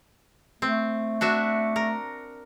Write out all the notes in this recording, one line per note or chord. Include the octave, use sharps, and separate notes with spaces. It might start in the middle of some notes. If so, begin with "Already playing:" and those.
A3 C4
D4 F#4 E5
A#4